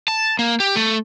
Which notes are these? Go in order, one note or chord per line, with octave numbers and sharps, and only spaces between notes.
A5
A#3
G4
A3